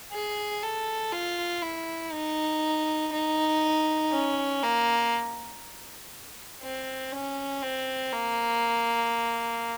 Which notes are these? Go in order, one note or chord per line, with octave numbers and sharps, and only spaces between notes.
G#4
A4
F4
E4
D#4
D#4
C#4
A#3
C4
C#4
C4
A#3